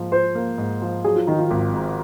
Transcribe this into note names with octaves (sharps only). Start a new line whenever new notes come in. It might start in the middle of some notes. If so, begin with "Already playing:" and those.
Already playing: G#2 F3 A#3
F4 C5
A#3
G#2
F3
F#3 G#4
F4
D#3 D#4
F4
G#1
G#2